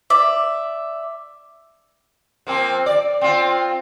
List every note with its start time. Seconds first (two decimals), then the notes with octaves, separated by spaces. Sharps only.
0.10 D5 E5
2.47 F3 A#3 C4
2.86 D5
3.21 C4 F4